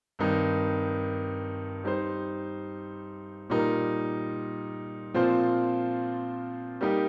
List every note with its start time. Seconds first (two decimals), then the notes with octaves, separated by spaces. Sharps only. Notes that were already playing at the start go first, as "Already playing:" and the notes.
0.19 G2 D#3 C4 D#4
1.84 G3 D#4 C5
3.50 A#2 G3 D#4 A#4
5.14 A#2 F3 C4 F4 C5
6.81 G3 A#3 D#4 G4